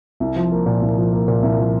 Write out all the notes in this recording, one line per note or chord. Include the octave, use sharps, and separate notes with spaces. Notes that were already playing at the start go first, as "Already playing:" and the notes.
C2
F3
A#3
A#2
C2
F3
A#3
A#2
C2
F3